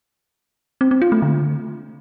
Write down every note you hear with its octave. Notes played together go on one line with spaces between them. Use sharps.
C4
C4
F4
A3
D3